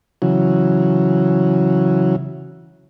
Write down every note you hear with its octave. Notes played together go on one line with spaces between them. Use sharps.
C#3 E3 F#3